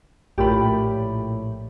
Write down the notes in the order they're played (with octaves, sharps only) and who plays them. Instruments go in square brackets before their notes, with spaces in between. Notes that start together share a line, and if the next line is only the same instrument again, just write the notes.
[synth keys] A#1 A2 [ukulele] G4 A#4 B5